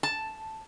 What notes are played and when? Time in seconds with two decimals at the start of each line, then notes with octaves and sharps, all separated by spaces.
0.03 A5